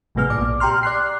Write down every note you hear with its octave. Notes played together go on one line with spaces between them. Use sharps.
G#1 A2 C3 B3 G#4 F6
A#1 A#2 D5 D6
G4 G5 A#5 C6 F6
D5 F#6 C7